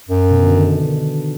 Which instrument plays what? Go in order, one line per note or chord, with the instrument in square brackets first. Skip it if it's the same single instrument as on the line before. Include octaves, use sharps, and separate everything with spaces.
[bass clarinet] F#2
[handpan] B2
D3
D#3